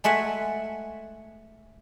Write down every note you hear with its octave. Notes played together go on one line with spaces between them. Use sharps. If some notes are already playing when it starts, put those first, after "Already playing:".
G#3 A3 E5 F#5 G#5